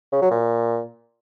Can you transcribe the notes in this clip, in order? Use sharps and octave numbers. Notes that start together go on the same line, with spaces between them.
C#3
F#3
A#2